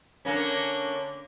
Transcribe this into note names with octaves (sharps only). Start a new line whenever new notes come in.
D3 A#3 C#4